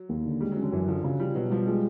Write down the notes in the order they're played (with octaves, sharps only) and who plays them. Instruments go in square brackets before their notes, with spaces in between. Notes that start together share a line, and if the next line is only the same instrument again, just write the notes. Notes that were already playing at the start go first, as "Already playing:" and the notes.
Already playing: [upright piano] F#3
[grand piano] D#2
D3
[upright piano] G3 [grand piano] G#3
[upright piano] F#3
[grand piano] C#4
[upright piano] D3
[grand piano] F#2 [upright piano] E3
[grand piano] D3 [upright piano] F3
[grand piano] C#3 [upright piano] F#3
[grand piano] F3 [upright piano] G3
[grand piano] B2 [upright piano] F#3
[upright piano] F3 [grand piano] G3
[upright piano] F3 [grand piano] G#3